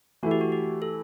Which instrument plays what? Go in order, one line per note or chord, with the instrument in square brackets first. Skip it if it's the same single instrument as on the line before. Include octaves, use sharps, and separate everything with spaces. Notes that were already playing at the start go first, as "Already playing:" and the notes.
[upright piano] E3 A3 E4 [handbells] F#4
[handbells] G4
F#4
G4
A4